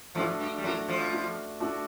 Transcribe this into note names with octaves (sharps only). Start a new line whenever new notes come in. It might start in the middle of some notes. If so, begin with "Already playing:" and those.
F2 F3 A3 D4 F#4
G2 G3
G3
F#2 F#3 A3 D4 F#4
F2 F3
A3 D4 F#4
A3 D4 F#4